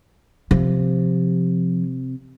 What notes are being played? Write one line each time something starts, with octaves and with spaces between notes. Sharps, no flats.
C3 F3